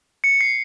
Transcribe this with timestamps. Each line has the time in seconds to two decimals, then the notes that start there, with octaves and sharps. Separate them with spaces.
0.24 C#7
0.41 C7